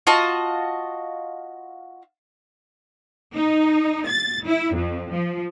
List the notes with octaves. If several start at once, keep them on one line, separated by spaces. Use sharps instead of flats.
F4 F#4 D#5 A5
D#4
A6
E4
F2
F3